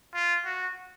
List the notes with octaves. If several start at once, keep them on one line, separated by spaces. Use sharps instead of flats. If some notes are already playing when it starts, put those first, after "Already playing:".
F4
F#4